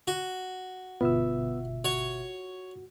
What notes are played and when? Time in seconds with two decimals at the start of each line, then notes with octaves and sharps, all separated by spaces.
0.08 F#4
1.01 G1 B2 B3 F4 E5 E6
1.85 F#4 C#5